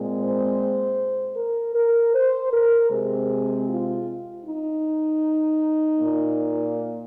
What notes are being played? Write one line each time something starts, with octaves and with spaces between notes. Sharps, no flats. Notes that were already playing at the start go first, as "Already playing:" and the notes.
Already playing: A#2 G#3 C4
C5
A#4
A#4
C5
A#4
C3 G#3 C4 G#4
F4
D#4
A#2 A#3